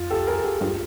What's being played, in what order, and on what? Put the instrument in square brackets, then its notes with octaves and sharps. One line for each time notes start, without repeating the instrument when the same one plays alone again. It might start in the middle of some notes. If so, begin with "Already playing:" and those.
Already playing: [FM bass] F2 [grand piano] F4
[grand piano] G4 A4
G#4 A#4
G4 A4
[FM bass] G2 [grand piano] F4 G4